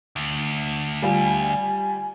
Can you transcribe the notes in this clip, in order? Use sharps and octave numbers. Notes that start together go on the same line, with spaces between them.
D2
G3 F4 G#5